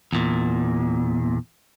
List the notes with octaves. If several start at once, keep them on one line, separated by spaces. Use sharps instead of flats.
E2 A#2